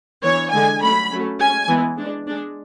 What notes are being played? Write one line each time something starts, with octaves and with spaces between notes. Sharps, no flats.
E3 B3 D4 C#5
D3 G#3 D4 G#5
F#3 A3 C#4 B5
F#3 A3 C#4
G#3 C#4 G#5
E3 G#3 B3
G#3 D4
G#3 D4